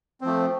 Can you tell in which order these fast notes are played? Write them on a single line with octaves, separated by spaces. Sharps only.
C4 F3 A3